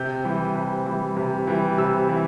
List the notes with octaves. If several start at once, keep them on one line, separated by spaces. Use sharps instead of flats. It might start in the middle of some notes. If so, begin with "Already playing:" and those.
Already playing: C3 G6
E3 G3
C3
E3 G3
C3
E3 G3
C3 E6
E3 G3